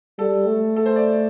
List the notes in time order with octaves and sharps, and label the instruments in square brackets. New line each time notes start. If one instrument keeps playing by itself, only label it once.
[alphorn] G3 [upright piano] A4
[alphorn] A3
[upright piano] A4
C5
D5